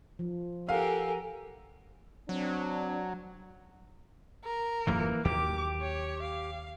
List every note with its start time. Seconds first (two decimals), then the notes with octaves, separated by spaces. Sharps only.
0.19 F3
0.69 G4 A4 A#4 F5 F#5 G#5
2.29 F#3 C4 D4
4.44 A#4
4.87 D#1 F#2 E3 F3 A#3
5.25 D#2 F#3 G4 D6
5.81 C#5
6.22 F5